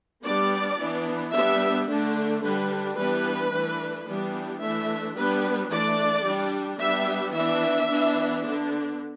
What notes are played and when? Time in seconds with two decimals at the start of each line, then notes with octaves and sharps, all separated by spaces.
0.24 G3 B3 D4 D5
0.79 E3 B3 D4
1.33 G3 B3 D4 E5
1.88 D3 A3 D4
2.42 D3 G3 D4 B4
2.96 E3 G3 B3 D4 B4
3.51 E3 A3 D4
4.06 E3 G3 B3 D4
4.60 E3 A3 D4 E5
5.15 G3 B3 D4 B4
5.70 E3 A3 D4 D5
6.24 G3 D4
6.79 G3 B3 D4 E5
7.33 E3 B3 D4 E5
7.88 E3 B3 D4
8.43 D3 B3 D4